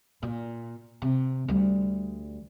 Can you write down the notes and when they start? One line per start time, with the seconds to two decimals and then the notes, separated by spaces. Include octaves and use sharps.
0.23 A#2
1.02 C3
1.48 D2 G3